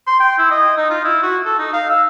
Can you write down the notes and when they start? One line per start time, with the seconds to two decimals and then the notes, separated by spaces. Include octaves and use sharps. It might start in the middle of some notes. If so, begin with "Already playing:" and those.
0.07 C6
0.20 G5
0.38 E4
0.51 D#5
0.77 D#4
0.90 F4
1.04 E4
1.22 F#4
1.45 A4
1.58 D#4
1.73 F5
1.90 E6